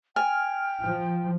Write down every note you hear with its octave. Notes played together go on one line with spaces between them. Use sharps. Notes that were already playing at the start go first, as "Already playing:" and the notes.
G5 G#5 F6
F3